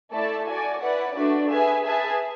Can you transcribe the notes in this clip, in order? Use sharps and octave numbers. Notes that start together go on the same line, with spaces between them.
A3 E4 A4 D5 A5
F#4 A4 D5 G#5
E4 B4 D5 F#5
A3 D4 F#4 B4 D5
G#4 B4 E5 G#5
G#4 B4 E5 A5